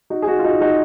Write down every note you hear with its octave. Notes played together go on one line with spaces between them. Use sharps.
D#4 F#4
G#4
D#4 F#4
F4
D#4 F#4
D#4 F#4